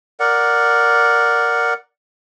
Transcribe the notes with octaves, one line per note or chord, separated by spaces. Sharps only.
A#4 D5 F#5